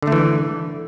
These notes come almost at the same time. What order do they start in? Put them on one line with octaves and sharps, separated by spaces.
D3 A3 E3